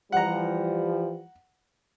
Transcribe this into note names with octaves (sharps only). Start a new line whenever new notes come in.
E3 F3 G3 F#5 A#5